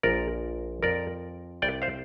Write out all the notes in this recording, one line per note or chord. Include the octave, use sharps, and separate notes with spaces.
A#1 A#2 F3 A#4 D5
F2 F3 A#4 D5
C2 C3 G3 D5 G5
C5 F5